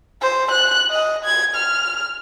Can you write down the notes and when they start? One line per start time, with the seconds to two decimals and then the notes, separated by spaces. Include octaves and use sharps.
0.22 C5
0.51 F#6
0.91 D#5
1.25 G#6
1.55 F6